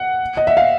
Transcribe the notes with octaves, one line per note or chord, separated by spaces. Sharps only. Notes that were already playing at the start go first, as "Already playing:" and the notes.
Already playing: F#5
D#5
E5
F5